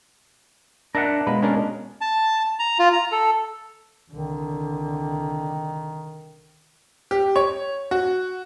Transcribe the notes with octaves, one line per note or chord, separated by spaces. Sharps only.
D4 A#4 E5 F#5
B2 G#3 A#3 B4
C#4 D4 A#4
A5
A#5
F4
A#5
A4
C2 D3 D#3
G4
C#5
F#4